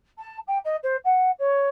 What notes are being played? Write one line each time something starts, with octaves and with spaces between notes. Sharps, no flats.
A5
G5
D#5
C5
F#5
C#5